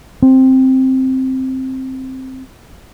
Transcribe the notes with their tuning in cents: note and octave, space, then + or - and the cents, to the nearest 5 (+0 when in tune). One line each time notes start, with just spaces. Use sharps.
C4 +5